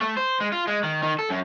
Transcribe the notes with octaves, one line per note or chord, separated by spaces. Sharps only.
A3
C5
G#3
F4
G#3
D#3
D#3
A4
F#2